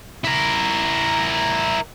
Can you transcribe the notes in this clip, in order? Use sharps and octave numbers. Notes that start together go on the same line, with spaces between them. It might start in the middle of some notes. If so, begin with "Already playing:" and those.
E4 A#4